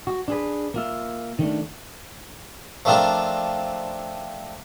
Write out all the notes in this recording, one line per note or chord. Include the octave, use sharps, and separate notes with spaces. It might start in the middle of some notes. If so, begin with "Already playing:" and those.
F#4
D4 G#4 B4
A#3 F4 E5
D#3 A3 D4
F3 A3 C4 D4 A#4